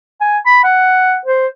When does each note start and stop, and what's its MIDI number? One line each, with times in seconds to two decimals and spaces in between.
0.21 0.39 80
0.46 0.60 83
0.64 1.18 78
1.26 1.47 72